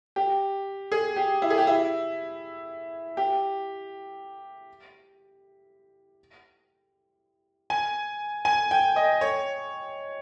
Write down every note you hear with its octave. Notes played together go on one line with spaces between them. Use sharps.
G4
G#4
G4
E4
G#4
G4
E4
G4
G#5
G#5
G5
D#5
C#5